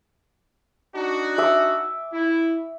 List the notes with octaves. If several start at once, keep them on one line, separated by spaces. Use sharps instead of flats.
D4 D#4 F#4
E5 D6 E6
E4